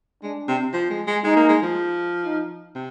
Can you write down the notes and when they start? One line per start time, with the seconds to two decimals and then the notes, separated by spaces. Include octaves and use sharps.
0.23 G#3 D4
0.48 C3
0.74 F3
0.90 G#3
1.07 G#3
1.24 G#3 D#4
1.36 A#3
1.49 G#3
1.62 F3
2.25 D#4
2.75 C3